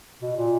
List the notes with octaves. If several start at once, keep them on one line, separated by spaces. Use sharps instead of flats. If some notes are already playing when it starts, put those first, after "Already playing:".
B2
A#2